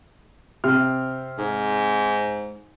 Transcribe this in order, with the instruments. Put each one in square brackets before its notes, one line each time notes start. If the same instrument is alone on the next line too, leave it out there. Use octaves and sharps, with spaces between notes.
[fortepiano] C3 C4 F6
[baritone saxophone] G#2